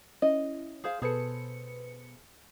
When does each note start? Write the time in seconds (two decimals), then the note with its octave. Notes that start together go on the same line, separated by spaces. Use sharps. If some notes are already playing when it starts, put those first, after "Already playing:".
0.22 C#4 E4 D#5
0.84 G#4 C5 F5
1.02 B2 G#4 A4 B4 C5 C#7